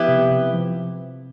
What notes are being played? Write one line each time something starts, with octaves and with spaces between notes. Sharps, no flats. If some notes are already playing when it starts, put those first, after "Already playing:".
Already playing: F3 B3 E4 G4
C3
C3
F3